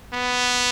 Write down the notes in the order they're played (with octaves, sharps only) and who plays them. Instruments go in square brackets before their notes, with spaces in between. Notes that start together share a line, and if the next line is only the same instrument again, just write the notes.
[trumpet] B3